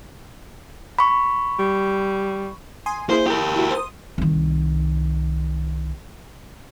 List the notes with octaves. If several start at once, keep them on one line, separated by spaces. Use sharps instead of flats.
B5 C#6
G3
G#5 C6 D#6
A#3 E4 G#4 C5
G4 A#4
E4 F#4
C5 D#6
C2 D#3